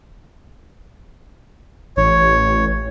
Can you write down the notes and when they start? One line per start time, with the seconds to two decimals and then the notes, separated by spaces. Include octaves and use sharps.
1.97 A1 C#5